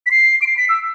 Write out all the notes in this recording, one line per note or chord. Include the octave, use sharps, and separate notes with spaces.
B6
C7
D7
C7
B6
E6